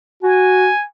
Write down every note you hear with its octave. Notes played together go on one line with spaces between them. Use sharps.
F#4 G#5